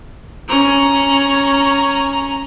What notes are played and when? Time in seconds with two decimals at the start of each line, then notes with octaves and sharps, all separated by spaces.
0.48 C#4 A#5